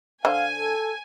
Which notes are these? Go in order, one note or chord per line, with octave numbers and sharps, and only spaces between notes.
D3 C5 F5 G#5
A4